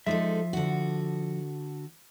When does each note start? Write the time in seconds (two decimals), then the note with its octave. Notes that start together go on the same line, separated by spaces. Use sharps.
0.06 F3 G#3 D#4 A4 E5
0.53 D3 F#4